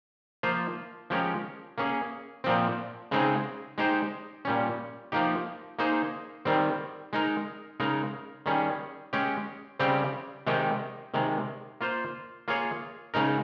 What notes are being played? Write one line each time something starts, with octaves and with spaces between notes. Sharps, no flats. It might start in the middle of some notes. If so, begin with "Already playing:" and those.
F3 A#3 F4 C5
F3 G#3 C#4 G4 A#4
A#3 C#4 G#4
A#2 F3 C4
C#3 G#3 C4 D#4 G#4
G#3 D#4 G4 C5
A#2 G3 C#4
F3 A#3 D#4 G4
A#3 D#4 G#4 C5
D#3 G3 C4
G#3 D#4 A#4
C#3 G#3 D#4 A#4
D#3 G3 C#4 G#4
G#3 C#4 G4
C#3 G3 C4 G4
C3 D#3 G#3 D#4 G4
C3 D#3 G#3
A#3 F4 C5
A#3 F4 G#4 C#5
C#3 G#3 D#4 A#4